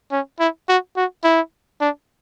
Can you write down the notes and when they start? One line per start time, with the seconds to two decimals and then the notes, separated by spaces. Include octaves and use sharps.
0.12 C#4
0.40 E4
0.69 F#4
0.97 F#4
1.24 E4
1.81 D4